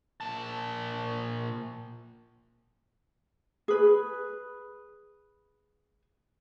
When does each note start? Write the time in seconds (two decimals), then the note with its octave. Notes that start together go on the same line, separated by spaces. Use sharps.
0.21 A#2 A5
3.68 G#4 B4